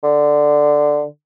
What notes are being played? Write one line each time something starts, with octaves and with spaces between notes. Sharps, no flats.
D3